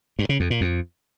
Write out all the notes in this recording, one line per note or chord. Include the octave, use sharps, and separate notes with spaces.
G2
C#3
F2
A#2
F2